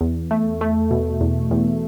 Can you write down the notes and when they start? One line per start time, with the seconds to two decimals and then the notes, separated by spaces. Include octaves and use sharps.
0.01 E2
0.31 A3
0.61 A3
0.91 B2
1.21 E2
1.51 E2